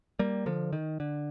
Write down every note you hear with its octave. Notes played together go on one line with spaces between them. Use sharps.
G3 A#3
D3 F3
D#3
D3